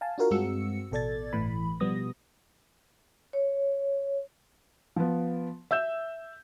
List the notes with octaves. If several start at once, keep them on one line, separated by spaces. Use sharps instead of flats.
F5 G#5 A5
D4 F4 F#4 A#4 F5
G2 G#3 C4 F#4 E6 C#7
A1 B2 A4 D5 G#6 A6
G1 A2 E3 B5
B2 F3 G3 B3 D#6 A#6
C#5
F3 B3
E5 E6 G6 E7